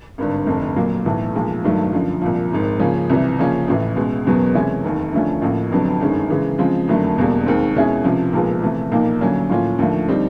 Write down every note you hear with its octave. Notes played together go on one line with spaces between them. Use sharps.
G#1 G2 D3
F1 F2 D3
A#2 F#3 A#3
B1 A2 E3 A3
B1 A#2 F3 G#3
G1 G2 D#3 F#3 A3
F#2 D3 F3
C2 A#2 F3
G#1 G#2 D#3
C#3 F3 A#3 C#4
C2 C3 E3
C#3 F3 A#3 C#4
A1 A2 E3
C#2 B2 G#3
F#1 E2 B2 F#3 B3
C3 E3 G#3 C#4 E4
F1 D#2 D#3
D2 D3 F3 A3 C#4
A1 A2 F3 A#3
F1 F2 D3 F#3 B3
G1 F#2 D#3 G#3 C#4
C#3 E3 G#3
C#3 F3 G#3 C4
F#1 F2 D3 F#3 A3
E1 E2 B2 G3 A#3
D#2 D#3 G#3 C4
B2 G#3 C#4 E4 G#4
C#2 C3 F3
B1 A#2 F3 G#3 B3
C3 E3 A3
B1 A#2 F3 A#3 D#4
D2 D3 F#3 A#3 C#4
A2 F3 A#3 C#4 F4
D#2 D3 F3 A3
D3 G3 C4 D#4